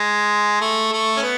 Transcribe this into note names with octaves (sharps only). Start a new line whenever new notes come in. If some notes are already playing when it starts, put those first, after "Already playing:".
Already playing: G#3
A3
A3
C#4
B3